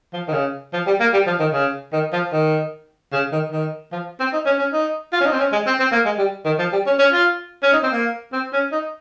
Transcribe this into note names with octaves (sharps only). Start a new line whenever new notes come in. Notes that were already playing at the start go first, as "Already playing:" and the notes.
F3
D#3
C#3
F3
G3
A#3
G3
F3
D#3
C#3
D#3
F3
D#3
C#3
D#3
D#3
F3
C4
D#4
C#4
C#4
D#4
F4
C#4
D#4
C4
C#4
G#3
C4
C4
A#3
G#3
G3
D#3
F3
G3
C#4
C#4
F4
C#4
D#4
C4
A#3
C4
C#4
D#4